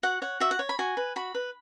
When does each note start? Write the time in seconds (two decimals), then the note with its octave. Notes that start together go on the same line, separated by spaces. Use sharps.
0.03 F#4 F#5
0.22 C#5 F#5
0.40 F#4 E5
0.51 F#5
0.59 C#5
0.69 B5
0.79 F#4 G#5
0.97 B4
1.16 F#4 B5
1.35 B4